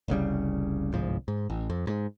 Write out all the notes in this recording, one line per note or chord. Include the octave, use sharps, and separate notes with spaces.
F1 C2 C#3 G3
G1 C2 G#2 F3
G#2
A1
F2
G#2